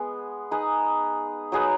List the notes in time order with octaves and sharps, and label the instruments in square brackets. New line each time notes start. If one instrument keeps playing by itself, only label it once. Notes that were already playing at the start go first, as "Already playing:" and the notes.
Already playing: [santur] G#3 B3 G#4
D#4 G#4 B4 D#5
F#3 D#4 G#4 B4